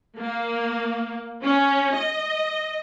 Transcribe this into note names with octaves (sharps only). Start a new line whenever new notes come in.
A#3
C#4
D#5